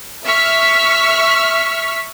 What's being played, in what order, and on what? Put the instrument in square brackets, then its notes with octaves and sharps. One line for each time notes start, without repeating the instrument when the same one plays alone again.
[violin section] E5 C#6 F6 B6